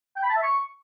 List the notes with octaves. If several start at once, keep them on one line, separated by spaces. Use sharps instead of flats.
G5
B5
A5
E5
C#6